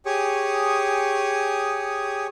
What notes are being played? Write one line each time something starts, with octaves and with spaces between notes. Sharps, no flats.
G4 G#4 C#5 G#5 C#6 D#6